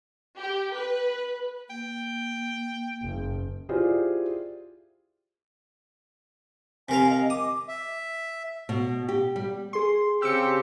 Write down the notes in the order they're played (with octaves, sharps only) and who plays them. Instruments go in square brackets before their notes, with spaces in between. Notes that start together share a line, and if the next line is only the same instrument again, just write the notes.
[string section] G4
B4
[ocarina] A#3 [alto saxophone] G5
[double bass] F#1
[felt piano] E4 F4 G4 G#4 C5 D5
[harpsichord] C3 A#4 F5 [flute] G#5
[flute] D#5
[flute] D6 [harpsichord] D#6
[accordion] E5
[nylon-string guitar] B2
G4
G3
[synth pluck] G#4 C6
[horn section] C#3 C4 G4 [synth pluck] E6 C#7